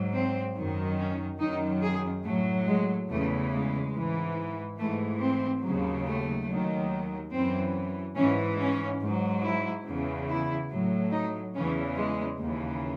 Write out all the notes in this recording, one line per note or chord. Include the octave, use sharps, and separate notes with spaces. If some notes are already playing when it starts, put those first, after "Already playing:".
Already playing: G#2 F#3
C4
F#2 D#3 F#3
C#4
F#2 D#3 F#3 D#4
G#4
A2 F#3 A3
G#3
E2 C#3 E3 A3
G#3
G#2 E3
G#2 E3 A3
C4
D#2 C#3 F#3
A3
D#2 D#3 F#3
F#2 E3 C4
G#2 E3 C#4
C#4
G#2 F#3
E4
E2 C#3 E3
E4
A2 F#3
D#4
E2 C#3 E3 C#4
G#3
D#2 C#3 E3